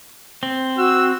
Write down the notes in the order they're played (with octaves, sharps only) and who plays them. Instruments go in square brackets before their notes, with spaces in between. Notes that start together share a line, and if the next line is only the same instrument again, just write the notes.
[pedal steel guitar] C4
[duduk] F#4 [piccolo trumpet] E6